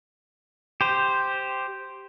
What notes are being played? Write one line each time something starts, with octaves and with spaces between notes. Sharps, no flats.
G4 C5